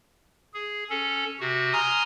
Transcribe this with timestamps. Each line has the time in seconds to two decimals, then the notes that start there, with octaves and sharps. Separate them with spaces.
0.54 G#4
0.90 C#4 A4
1.40 C3 F#4
1.73 G#5 A#5 C6 D#6 F6